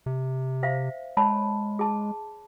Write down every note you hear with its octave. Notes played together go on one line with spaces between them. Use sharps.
C3
C5 E5 F5
G#3 C#5 A5 B5
G#4 A5